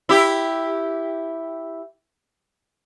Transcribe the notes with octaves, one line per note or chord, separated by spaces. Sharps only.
E4 G4